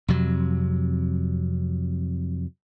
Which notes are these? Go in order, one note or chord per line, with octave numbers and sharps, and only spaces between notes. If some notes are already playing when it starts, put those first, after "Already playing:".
F2 C3 F#3